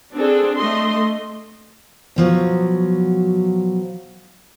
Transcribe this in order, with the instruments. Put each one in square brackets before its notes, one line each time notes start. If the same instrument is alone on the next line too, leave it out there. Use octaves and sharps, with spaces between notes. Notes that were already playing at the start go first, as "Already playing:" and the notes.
[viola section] C4 D4 G#4 A4
A3 D#5 C6
[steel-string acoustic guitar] B2 F3 F#3